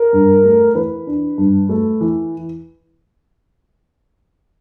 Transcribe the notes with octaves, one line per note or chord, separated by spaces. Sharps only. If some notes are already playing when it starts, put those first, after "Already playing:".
Already playing: A#4
G2
A3
E3 B4
D4
G2
A3
E3